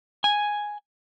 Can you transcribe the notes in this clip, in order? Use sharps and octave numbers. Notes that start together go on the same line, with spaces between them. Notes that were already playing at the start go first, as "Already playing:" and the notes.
G#5